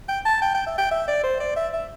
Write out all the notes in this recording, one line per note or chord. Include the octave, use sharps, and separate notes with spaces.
G5
A5
G5
G5
E5
G5
E5
D5
C5
D5
E5
E5